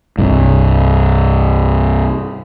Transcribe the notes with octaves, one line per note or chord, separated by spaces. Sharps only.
C2 G2